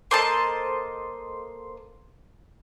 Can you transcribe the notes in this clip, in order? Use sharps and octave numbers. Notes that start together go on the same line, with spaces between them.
A#3 A4 C5 D#5 A5 C6